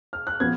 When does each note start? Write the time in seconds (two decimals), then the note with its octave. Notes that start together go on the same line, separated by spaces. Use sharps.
0.13 F6
0.27 F#6
0.40 F3 B3 G#6